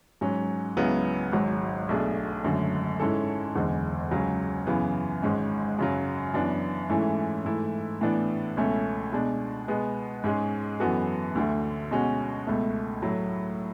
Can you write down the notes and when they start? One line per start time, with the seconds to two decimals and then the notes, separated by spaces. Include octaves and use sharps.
0.21 G#2 F#3 C#4
0.77 C#2 C#3 F#3 B3 E4
1.32 G#1 G#2 F#3
1.89 B1 B2 A3 D4 G#4
2.44 G#1 F#2 D3 A3
3.00 G#2 G#3 C#4 E4 A4
3.55 F#1 E2 D3 G#3
4.11 C#2 C#3 F#3 C#4
4.67 F#2 C#3 E3 B3
5.22 G#1 G#2 G#3 C#4
5.79 F#2 C#3 F#3
6.34 F#2 E3 B3 D4
6.90 G#2 E3 A3 C#4 E4
7.45 G#2 E3 A3 E4
8.01 A2 E3 B3 D4
8.57 C#2 B2 A3 C#4
9.12 B2 G#3 D4
9.68 B2 G#3 B3
10.24 G#2 G#3 C#4 G#4
10.80 F#2 E3 B3 F#4 A4
11.35 D2 D3 A3
11.91 B2 G#3 C#4 F#4
12.47 C#2 B2 A3
13.02 A2 F#3 A3